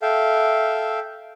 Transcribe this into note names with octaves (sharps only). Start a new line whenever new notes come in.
A4 E5 F5 G5